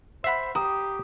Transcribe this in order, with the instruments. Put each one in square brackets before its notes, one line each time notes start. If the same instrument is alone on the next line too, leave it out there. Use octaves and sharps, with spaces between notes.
[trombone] C5 [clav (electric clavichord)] E5 F#5 [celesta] B5 B6 C7
[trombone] G4 [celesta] A#5 [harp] D#6